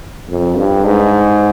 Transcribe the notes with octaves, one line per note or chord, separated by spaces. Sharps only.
F2
G2
G#2